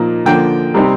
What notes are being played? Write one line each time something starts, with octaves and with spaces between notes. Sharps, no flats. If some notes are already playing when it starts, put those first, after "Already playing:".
Already playing: A#2 F3 A#3 D#4
D3 F3 A#3 G5
C3 G3 C4 D#4